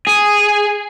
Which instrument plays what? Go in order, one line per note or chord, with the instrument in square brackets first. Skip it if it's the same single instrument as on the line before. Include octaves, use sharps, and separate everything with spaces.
[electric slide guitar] G#4